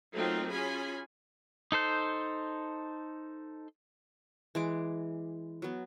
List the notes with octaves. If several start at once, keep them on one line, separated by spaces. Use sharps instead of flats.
F#3 A3 A#3 C4 D#4 F4
C#4 F4 G#4 G#5 B5
D#4 A4 C5 G6
E3 G#3 D6
F#3 B3